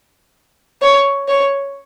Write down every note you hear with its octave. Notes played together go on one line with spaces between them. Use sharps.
C#5
C#5